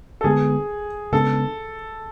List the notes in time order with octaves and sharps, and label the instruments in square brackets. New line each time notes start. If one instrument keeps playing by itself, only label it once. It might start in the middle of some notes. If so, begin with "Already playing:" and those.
[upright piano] A4
[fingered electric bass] D3 G#3 B3 [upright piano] G#4
[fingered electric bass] C#3 G#3 B3 D4 [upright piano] A4